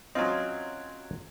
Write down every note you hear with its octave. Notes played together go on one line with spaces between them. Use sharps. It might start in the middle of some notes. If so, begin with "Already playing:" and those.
F#3 C4 C#4 F4 D#5